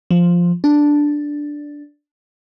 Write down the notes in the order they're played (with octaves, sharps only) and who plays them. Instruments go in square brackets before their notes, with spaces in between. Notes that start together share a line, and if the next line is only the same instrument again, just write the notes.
[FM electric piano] F3
D4